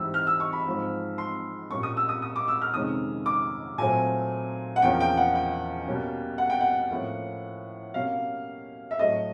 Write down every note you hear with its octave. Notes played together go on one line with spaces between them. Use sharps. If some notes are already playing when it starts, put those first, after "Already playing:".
Already playing: G#2 E3 G3 C4 E6
F6
E6
C#6
B5
G#2 F3 G#3 C4
C6
A#2 G3 A#3 C#4 C#6
D#6
E6
D#6
D#6
D6
E6
F6
F2 C3 D#3 G#3 C#4 D#6
D6
A#2 F#3 A3 C4 G#5
F#5
E2 C#3 F3 A#3 C#4 G5
G5
F#5
G5
B2 G3 A#3 C#4
F#5
G5
F#5
A2 F3 A#3 C#4
B2 G3 A#3 C#4 F5
E5
A2 F#3 A3 D#5